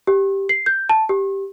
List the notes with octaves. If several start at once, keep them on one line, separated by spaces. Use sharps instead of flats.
G4
C7
G6
A5
G4